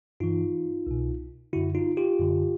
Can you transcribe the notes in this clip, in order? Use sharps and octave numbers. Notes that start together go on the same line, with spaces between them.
G2 E3 D#4 F4
C2 B2
F#2 D3 E4 F#4
D#4 F4
F4 G4
F#2 D3